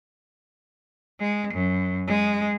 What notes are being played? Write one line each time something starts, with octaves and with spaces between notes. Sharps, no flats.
G#3
F#2
G#3